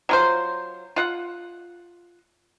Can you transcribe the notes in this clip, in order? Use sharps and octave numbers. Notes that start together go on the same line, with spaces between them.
F#3 F4 C5
F4 F#5